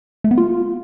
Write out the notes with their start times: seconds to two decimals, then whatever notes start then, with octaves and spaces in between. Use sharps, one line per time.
0.24 A3
0.31 B3
0.38 F4